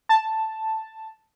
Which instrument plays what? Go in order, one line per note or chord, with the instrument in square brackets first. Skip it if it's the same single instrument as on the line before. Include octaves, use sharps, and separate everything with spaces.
[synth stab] A5